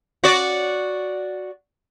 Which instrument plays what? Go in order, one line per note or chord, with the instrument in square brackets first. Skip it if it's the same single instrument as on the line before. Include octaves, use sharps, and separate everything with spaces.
[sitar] F#4 D5